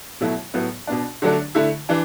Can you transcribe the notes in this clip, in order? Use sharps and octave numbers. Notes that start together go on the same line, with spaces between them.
B2 F#3 A3 E4
A2 F#3 B3
B2 B3 D4
D3 F#3 A3 D4
D3 A3 E4
E3 D4